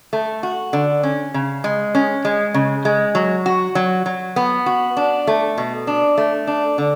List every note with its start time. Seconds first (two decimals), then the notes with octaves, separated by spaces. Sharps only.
0.13 A3
0.43 F#4
0.73 D3
1.03 C#4
1.34 C#3
1.64 G#3
1.95 C#4
2.25 G#3
2.54 C#3
2.85 G#3
3.15 F#3
3.46 F#4
3.75 F#3
4.06 F#3
4.36 B3
4.66 F#4
4.97 D4
5.27 A3
5.58 B2
5.87 D4
6.18 A3
6.47 D4
6.78 D3